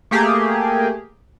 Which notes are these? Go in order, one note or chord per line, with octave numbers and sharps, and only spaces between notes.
A3 A#3 G4 G#4